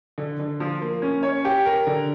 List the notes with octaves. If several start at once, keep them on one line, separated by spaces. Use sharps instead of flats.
D3
D3
F3
A#3
C#4
C#5
G4
A#4
D3